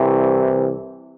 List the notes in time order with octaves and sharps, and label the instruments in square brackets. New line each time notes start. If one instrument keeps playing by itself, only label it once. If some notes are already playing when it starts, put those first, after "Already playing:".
Already playing: [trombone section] C2 C3 E3